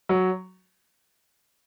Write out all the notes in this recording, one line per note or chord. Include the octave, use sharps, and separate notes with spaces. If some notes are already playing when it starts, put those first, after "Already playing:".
F#3